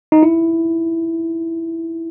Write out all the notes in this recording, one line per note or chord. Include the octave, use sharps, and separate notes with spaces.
D#4
E4